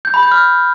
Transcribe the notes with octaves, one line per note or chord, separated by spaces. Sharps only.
G6
B5
G6
F6